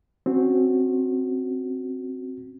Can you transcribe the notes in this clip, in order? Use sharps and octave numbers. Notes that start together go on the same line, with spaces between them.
C4 C#4 F#4